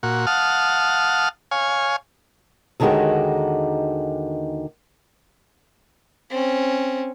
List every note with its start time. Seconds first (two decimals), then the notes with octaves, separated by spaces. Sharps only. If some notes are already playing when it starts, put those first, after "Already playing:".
0.03 A#2 F#4
0.27 F5 F#5 A5 D#6 F6
1.51 C#5 F5 G#5
2.80 D#2 D3 D#3 G#3 F#4 G4
6.30 C4 C#4